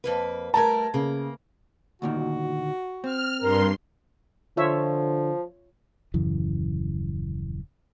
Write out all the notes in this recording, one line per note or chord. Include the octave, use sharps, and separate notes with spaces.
F2 A#3 B4
G3 A3 A#4 A5 A#5 G#6
C#3 A#3
D2 A#2 D#3 F#4
C4 F6
G2 A#4 C6
D3 F3 F4 C#5 E5
D#1 F#2 C#3 E3